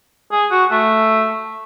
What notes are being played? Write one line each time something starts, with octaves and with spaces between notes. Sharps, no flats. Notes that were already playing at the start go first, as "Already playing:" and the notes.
G#4
F#4
A3